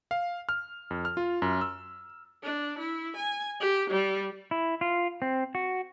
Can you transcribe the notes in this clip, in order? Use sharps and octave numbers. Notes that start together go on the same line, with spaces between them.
F5
F6
F2
F6
F4
F#2
E6
D4
E4
G#5
G4
G3
E4
F4
C4
F#4